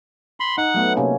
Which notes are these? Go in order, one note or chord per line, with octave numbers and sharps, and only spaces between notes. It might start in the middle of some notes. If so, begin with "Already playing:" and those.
B5 C6
D#4 F#5
F#3 A3 B3
C3 A#3 C#4